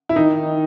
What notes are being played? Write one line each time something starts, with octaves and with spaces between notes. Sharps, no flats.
E4
D#3 D#4